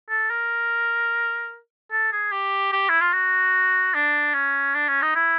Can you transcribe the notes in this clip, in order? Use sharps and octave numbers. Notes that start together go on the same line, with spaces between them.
A4
A#4
A4
G#4
G4
G4
E4
F4
F#4
D4
C#4
D4
C#4
D#4
E4